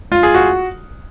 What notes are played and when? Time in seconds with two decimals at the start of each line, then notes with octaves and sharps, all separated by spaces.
0.12 F4
0.23 G#4
0.35 F#4